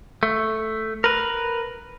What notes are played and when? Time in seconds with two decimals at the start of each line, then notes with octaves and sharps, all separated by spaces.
0.23 A3
1.04 A#4 B4